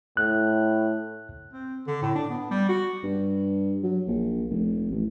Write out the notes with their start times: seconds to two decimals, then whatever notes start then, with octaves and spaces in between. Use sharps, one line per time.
0.17 A2 F#6
1.53 C4
1.87 D3
2.02 A2
2.15 D4
2.30 B3
2.51 G3
2.69 F#4
3.03 G2
3.83 F#3
4.07 A#1
4.50 F1
4.91 A1